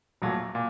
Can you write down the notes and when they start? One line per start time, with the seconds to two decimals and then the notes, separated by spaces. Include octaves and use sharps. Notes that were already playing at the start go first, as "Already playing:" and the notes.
0.22 A#1 A#2 F#3 A3
0.55 A#2